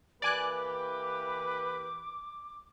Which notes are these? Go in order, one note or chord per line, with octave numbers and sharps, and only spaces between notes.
E3 A#3 G4 B4 D5 G#5 D6 F#6